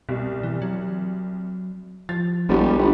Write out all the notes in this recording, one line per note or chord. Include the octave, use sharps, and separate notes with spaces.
C2 B2
E3
F#3
F3 A6
E1 A#1 G3 B3 G4
G1